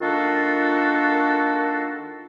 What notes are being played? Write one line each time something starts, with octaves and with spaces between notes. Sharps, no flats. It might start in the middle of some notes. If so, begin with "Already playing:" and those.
D#3 A#3 D4 F4 F#4 A4